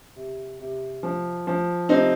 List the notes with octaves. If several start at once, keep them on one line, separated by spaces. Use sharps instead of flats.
C3
C3
F3
F3
C3 C4 D#4